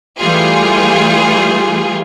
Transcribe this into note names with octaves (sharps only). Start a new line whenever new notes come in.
E3 G3 A3 F4 G#4